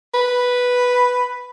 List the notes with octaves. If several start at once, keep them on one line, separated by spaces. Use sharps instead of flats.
B4